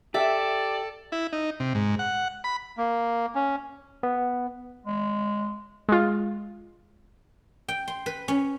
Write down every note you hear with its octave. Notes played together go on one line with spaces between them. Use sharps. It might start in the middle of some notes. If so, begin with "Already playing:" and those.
G4 A4 D5 E5
E4
D#4
C3
G#2
F#5
B5
A#3
C#4
B3
G#3
G#3 F4
G5
C6
B4
C#4